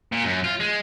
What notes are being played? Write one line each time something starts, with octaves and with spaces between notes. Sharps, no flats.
A#2
F#2
F4
G#3